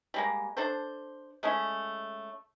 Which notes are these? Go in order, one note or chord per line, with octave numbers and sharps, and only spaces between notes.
G3 G#3 A#3
D4 A4 C5
G#3 A3 C#4 E4